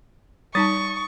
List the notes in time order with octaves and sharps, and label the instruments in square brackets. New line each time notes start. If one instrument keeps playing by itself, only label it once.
[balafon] G3 D#4 A5 [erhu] C#6 [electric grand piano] D#6 A6